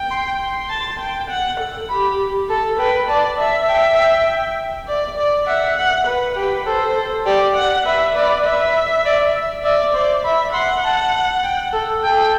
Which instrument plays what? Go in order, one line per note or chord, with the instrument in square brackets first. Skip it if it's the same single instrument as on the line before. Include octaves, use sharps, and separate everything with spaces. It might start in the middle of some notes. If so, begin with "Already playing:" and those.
Already playing: [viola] G5
[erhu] C6
C6
[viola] A5
G5
F#5
A4
[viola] G4 [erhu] B5
[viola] A4 [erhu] A5
[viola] B4 [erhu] G5
[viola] D5 [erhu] A5
[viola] E5 [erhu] A5
[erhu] G5
G5
[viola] D5
D5
[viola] E5 [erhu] F#5
[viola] F#5
B4
[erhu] G4 [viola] B4
[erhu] A4 [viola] C5
[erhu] A4
[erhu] G4 [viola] D5
[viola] F#5
[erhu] B4 [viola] E5
[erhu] B4 [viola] D5
[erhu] B4 [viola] E5
[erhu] D5
E5
[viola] D5 [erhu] E5
[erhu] C5 [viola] D5
[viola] E5 [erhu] B5
[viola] F#5 [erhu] C6
[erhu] A5
G5
A4
[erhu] A4 [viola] G5